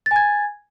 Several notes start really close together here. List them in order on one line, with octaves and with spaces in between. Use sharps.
A6 G#5 G#6